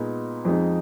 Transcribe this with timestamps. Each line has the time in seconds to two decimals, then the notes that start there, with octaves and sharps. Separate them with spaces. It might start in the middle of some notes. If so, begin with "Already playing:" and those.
Already playing: A#2 G#3 B3 D#4
0.45 F2 F3 G#3 D#4